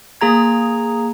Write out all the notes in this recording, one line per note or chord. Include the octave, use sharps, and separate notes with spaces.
A#3 G#4 A#5 G#6